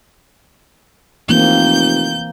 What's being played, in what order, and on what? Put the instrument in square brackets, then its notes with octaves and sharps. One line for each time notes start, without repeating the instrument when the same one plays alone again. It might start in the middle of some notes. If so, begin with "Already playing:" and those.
[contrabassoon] F1 [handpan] E3 A#3 C4 [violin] G6